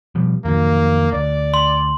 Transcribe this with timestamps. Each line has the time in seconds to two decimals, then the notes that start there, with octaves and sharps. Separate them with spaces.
0.15 B2 F3 G3
0.45 F2 D#3 F#3 A#3
1.13 D2 D5
1.54 C6